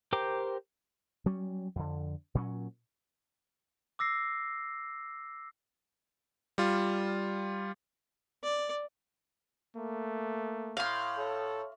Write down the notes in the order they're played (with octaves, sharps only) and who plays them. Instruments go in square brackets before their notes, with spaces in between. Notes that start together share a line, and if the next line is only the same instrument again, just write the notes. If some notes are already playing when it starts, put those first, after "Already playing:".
[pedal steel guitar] G4 A#4 C5 G5 D6
[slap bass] F#3 G3 C#4
F2 D3
A#2 F#3 C#4
[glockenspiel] D6 E6 A#6 C7
[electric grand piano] G3 F4
[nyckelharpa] D5
[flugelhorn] A3 [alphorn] A#3
[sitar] A2 [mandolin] F5 C6
[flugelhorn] A4 [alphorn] C#5